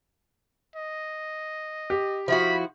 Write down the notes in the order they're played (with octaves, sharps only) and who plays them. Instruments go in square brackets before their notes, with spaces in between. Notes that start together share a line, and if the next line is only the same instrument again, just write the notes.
[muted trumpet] D#5
[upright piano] G4
[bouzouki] F3 E4 F#4 [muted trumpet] B5